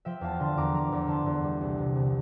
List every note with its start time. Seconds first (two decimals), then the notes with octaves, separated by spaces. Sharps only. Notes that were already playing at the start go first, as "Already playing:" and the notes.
0.05 F3 E5 G5
0.21 E2 F5 A5
0.40 D3 A5 C6
0.57 E2 A#5 D6
0.72 F3 A#5 D6
0.92 E2
1.07 D3 A5 C6
1.26 E2
1.43 G3
1.61 C2
1.78 C3
1.95 C2